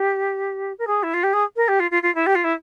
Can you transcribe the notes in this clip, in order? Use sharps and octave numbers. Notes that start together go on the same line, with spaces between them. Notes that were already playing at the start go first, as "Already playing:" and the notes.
Already playing: G4
A#4
G#4
E4
F4
G4
G#4
A#4
G4
F4
F4
F4
E4
G4
F4
E4